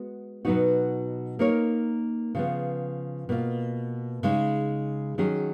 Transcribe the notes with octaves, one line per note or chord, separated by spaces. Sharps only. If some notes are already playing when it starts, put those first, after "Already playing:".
Already playing: G#3 B3 F#4
B2 F#3 B3 D#4 F#4
A#3 D#4 A#4 C#5
C#3 F3 B3
B2 A#3 F4
C#3 G#3 D#4
D#3 F#3 C#4 G#4